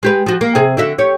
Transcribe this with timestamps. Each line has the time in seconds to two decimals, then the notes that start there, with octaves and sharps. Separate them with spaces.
0.03 G#3 G4 B4
0.26 F3 F#4
0.41 A#3
0.55 C3 G#4
0.77 D3 F#4 E5
0.99 G4 C#5